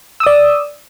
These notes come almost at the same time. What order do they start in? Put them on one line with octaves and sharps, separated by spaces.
E6 D#6 D5